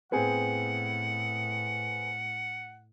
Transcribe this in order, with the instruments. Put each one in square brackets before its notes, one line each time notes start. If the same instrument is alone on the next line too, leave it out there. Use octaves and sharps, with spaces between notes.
[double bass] A2 [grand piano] B3 C4 G#4 [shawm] F#5